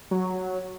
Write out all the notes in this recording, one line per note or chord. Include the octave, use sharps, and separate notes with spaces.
F#3